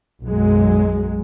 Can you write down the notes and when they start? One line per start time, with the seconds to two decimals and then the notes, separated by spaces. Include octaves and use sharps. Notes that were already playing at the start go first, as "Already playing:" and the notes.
0.23 B1 F#2 F#3 G#3